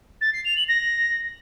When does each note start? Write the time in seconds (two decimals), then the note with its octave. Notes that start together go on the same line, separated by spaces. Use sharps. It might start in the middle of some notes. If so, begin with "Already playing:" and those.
0.21 A6
0.33 C7
0.45 F7
0.56 F#7
0.68 A#6